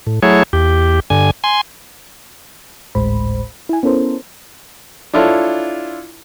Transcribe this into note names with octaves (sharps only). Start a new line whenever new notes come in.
A2
F#3 A3 E4 G#4 C#5
E2 G4
G2 D3 G#5
G#5 C6
G#1 D2 A2 G#3 C5 B5
E4 G#5
B3 C#4 E4 A4 A#4 C5
D4 E4 F4 A4 C#5